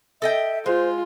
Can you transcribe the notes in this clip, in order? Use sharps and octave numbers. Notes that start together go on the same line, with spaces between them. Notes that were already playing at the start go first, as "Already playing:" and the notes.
A4 D#5 E5 G5
G#3 F4 C5